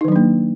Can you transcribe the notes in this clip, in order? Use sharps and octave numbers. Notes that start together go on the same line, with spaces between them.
D#3 F#3 A#3 D4 D#4